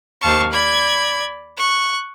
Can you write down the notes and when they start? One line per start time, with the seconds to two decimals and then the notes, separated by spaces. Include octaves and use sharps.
0.21 D#2 C5 F5 A5 C#6
0.49 D5 B5 G#6
1.56 C#6 F#6